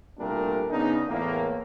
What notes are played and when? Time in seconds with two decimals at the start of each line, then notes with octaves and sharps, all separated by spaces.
0.19 C2 A#2 G3 A3 D4 A#4
0.70 C#3 B3 D4 D#4
1.09 E2 A2 A#3